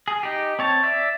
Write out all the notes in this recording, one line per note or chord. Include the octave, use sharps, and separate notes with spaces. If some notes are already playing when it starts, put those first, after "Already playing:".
G#4
D#4 G4
C4 C#5 A5
D5 E5